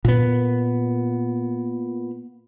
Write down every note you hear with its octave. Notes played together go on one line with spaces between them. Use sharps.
A#2 B3